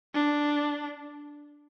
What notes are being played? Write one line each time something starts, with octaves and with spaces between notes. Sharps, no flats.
D4